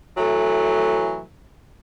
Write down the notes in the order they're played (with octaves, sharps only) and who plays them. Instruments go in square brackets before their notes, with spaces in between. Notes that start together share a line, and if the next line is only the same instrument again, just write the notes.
[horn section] E3 F#3 A3